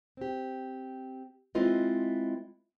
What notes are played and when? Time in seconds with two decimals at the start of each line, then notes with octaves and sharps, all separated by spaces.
0.17 C4 G4
1.55 G#3 C4 E4 F4 B4 D#5